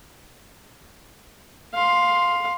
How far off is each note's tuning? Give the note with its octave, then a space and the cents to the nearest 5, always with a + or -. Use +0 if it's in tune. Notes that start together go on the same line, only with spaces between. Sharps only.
F5 +10 C6 +0